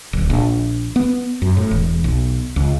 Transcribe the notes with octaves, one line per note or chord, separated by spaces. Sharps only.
D1
A#1
B3
F#2
A2
E1
B1
C#2